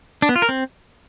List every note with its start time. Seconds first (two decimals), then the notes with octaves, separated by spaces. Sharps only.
0.22 D4
0.29 B3
0.36 F4
0.42 A#4
0.49 C4